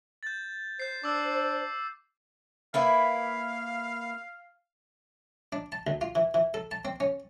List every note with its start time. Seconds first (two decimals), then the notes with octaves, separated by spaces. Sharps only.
0.23 G6 A6
0.80 C5 G6 C7
1.04 D4 D6 E6
2.74 A#3 E4 B4 F5
5.52 D4
5.72 A5
5.87 D2
6.01 F4
6.15 E3
6.34 E3
6.54 A4
6.71 A5
6.85 C4
7.00 C#4